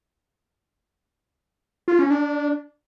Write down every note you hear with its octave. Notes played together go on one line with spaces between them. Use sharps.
F4
C#4
D4